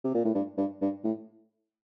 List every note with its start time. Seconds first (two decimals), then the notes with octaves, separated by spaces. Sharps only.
0.04 C3
0.14 A#2
0.24 A2
0.35 G2
0.58 G2
0.81 G2
1.04 A2